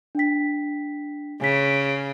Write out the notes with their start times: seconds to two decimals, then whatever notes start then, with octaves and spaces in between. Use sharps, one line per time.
0.15 D4 G5 B6
1.41 C#3 G#5 B6